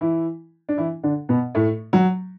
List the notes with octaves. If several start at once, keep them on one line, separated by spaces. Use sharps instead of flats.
E3 E4
D4
E3 E4
D3 D4
B2 B3
A2 A3
F#3